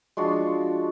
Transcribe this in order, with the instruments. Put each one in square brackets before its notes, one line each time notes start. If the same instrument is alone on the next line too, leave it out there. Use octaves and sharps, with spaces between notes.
[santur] F3 G#3 D4 F4 F#4